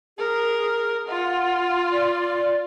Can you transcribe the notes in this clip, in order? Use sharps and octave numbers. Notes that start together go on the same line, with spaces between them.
G#4 A#4
F4 F#5
D5